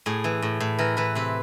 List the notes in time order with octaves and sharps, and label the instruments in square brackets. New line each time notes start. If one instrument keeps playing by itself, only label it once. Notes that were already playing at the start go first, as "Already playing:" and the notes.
[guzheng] A2 G#4
E3
A2
A2
E3 A#4
E3 B4
C3 B4